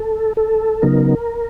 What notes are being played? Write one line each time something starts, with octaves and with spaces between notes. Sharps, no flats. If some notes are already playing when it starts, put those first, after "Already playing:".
Already playing: A4
A4
C#3 F#3 B3 D#4 A#4